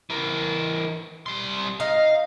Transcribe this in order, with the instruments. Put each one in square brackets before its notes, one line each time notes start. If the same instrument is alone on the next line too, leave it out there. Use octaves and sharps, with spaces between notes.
[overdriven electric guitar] E3 A#4
G3 C6
[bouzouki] D#4 D#5 [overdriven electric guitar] F5